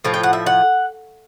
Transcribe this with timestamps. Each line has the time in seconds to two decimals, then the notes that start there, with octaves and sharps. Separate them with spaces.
0.04 A2 F3
0.14 G5
0.23 F#5
0.33 E5
0.46 F#5